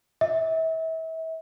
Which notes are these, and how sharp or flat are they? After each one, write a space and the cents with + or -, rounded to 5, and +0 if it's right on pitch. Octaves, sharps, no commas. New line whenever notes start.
E5 -35